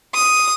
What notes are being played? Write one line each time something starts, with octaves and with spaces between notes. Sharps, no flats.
D#6